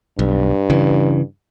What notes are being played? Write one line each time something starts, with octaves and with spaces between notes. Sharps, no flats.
B1 G2
C#3 E3